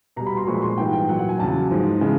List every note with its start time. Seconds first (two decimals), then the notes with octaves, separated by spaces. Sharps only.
0.16 B2 A#5
0.20 G3
0.27 B5
0.37 C6
0.47 A#2 F3 G#3 C#6
0.62 C6
0.78 G#2 E3 G3 G5
0.93 G5
1.09 A#2 F#3 F#5
1.19 F#5
1.29 G#5
1.39 E2 C#3 F#3 A5
1.71 G#2 F3 G#3
2.01 C#3 E3 G#3